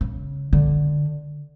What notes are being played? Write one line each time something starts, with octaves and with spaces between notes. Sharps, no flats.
C#3
D3